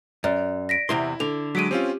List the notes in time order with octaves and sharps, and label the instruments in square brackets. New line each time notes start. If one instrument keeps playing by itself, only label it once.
[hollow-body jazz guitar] F#2 [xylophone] D5
[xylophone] A#6 B6 D7
[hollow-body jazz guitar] E2 C3 C6 [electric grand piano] E4
[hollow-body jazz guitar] D3 [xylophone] F7
[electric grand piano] F#3 G#3 [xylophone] B6 D7 D#7
[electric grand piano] C4 C#4 F4 [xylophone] G4